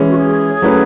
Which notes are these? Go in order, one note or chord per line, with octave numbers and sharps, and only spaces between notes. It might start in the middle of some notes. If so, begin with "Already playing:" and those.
Already playing: E3 G#3 C#4
F#4
G#4
F#3 A3 C#4 E4 B4